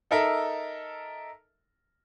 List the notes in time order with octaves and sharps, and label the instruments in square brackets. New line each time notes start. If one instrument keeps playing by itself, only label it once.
[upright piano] D#4 A4 A#4 E5